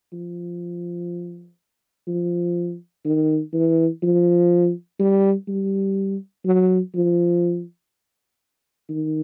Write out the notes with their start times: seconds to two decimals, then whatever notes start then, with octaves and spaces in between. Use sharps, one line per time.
0.13 F3
2.08 F3
3.05 D#3
3.53 E3
4.03 F3
4.99 G3
5.48 G3
6.45 F#3
6.95 F3
8.89 D#3